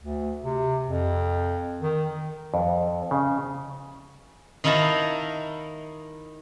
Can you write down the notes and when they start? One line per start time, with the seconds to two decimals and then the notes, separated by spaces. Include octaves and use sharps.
0.02 D2
0.44 C3
0.87 F2
1.81 D#3
2.54 F2
3.11 C#3
4.64 D#3 D#4 E4 F5 A5 A#5